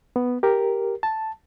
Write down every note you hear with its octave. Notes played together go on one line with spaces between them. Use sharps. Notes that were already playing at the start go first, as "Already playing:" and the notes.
B3
G4 A#4
A5